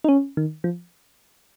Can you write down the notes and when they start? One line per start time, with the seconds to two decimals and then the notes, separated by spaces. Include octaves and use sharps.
0.04 D#4
0.09 C#4
0.37 D#3
0.64 F3